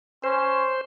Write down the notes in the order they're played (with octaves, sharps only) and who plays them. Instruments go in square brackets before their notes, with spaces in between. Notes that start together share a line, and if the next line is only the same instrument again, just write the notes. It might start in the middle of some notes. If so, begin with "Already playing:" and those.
[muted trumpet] C#4 [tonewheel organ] C5